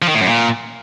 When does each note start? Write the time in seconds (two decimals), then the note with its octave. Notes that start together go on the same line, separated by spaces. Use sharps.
0.02 F3
0.08 D#3
0.15 A2
0.21 F#2
0.27 A#2